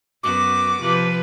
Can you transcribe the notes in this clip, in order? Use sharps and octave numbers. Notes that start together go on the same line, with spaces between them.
F#2 B3 F#4 D6
C3 F3 B4